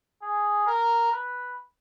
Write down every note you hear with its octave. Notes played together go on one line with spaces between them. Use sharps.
G#4
A#4
B4